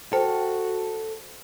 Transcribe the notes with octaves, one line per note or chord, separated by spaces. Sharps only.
F#4 A4 C5 G5